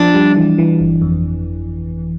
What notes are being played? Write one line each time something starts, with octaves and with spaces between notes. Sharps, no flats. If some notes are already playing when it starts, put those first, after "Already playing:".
Already playing: F3 D4
G3
E3
E3
G1
F2